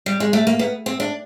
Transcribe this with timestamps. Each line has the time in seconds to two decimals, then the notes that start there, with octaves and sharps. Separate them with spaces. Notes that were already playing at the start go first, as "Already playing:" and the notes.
0.06 G3
0.20 G#3
0.33 A3
0.47 A#3
0.59 B3
0.86 C4
1.00 D4